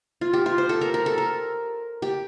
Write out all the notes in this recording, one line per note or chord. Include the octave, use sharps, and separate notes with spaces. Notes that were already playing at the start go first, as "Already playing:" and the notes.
F4
G4
F4
C5
A4
A#4
A#4
A4
A#4
G4